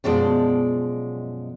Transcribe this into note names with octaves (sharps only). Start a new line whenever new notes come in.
F#2 B2 F3 G#3 D5